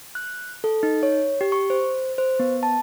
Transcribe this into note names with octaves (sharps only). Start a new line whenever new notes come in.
F#6
A4
D#4
C#5
G4
C#6
C5
C5
B3
A5